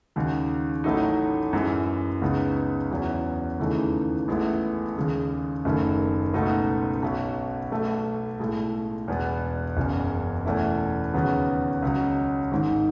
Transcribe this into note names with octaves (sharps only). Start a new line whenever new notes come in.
D#2 C#3 G#3 D#4 F#4
A1 A2 F#3 A3 D#4
F#2 E3 G#3
C#2 C#3 G#3 B3 D#4
E2 C#3 F#3 B3 E4
D#2 C#3 E3 A3 D#4
A1 A2 G#3 B3 E4
D#2 C#3 G#3
F#1 F#2 D#3 A3
C#2 B2 A3 D#4 F#4
B1 B2 F#3
B1 B2 A3
B1 A2 G#3
E1 E2 B2 G#3 B3
F#1 E2 C#3
E2 B2 A3 E4
D#2 C#3 F#3 B3
C#2 C#3 F#3
G#1 G#2 D#3 G#3 D#4